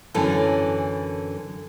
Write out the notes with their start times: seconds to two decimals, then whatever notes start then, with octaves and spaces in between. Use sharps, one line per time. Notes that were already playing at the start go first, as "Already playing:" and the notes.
0.14 F#2 D3 E3 C#4 A4 A#4